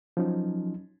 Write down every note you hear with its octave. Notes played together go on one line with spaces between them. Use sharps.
F3 F#3 C#4 D#4